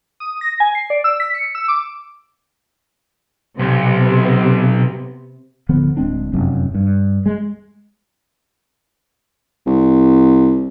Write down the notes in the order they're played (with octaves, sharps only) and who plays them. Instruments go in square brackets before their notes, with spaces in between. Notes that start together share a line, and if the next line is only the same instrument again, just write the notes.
[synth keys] D#6
A#6
G#5
C7
D5
E6
B6
C#7
E6
D6
[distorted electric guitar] B1 [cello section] C3 B3
[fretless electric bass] D1 D3 F3 B3
D1 G#3 C4 D4
F1 F#2
G2
G#3
[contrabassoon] C2